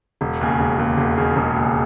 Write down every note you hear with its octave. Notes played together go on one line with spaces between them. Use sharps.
E1
D#2 C#3
E1
D#2 C#3
E1
D#2 C#3
E1
D#2 C#3